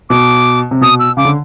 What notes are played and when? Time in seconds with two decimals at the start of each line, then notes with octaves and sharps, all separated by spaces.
0.10 B2 D6
0.71 C3
0.81 B2 D#6
1.00 E6
1.17 C#3 D6
1.25 D3